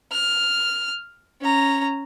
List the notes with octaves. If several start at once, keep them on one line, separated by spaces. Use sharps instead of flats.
F6
C#4 A#5